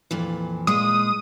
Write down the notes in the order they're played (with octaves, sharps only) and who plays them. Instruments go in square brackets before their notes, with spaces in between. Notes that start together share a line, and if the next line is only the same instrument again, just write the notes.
[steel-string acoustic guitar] F2 A#2 E3
[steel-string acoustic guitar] A#2 G#3 [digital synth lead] D#6